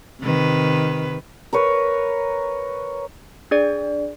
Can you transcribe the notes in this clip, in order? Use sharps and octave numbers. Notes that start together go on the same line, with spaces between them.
C3 D#3 B4
A#4 B4 C#5
D4 G#4 D5